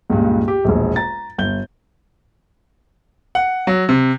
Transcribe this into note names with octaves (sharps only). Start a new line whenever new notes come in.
C#2 G2 A#2
G4
E1 A#1
A#5 A6
G1 G6 G7
F#5
F#3
C3